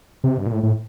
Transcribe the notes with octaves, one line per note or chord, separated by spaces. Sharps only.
C3
G2
A#2
A2
A2